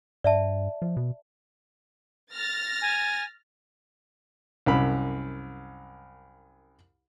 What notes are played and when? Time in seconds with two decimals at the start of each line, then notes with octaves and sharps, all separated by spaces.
0.24 G2 D5 E5 A5
0.82 F3
0.97 B2
2.33 F6 A6 A#6
2.82 G#5
4.66 C2 F#2 B5